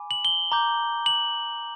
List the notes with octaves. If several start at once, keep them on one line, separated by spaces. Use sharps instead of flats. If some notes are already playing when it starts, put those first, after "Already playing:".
Already playing: G#5 B5 D6
F#7
G7
A#5 D6 G6
F#7